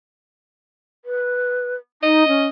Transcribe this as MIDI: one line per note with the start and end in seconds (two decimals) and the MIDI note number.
1.05 1.75 71
2.03 2.26 63
2.03 2.50 75
2.28 2.47 61